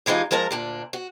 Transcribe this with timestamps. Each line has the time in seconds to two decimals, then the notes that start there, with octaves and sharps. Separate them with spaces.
0.06 G2 E3 G#3 D#4 F4
0.31 F3 G#3 A#4 A5 A#5
0.51 D2 A#2 D4
0.93 F#4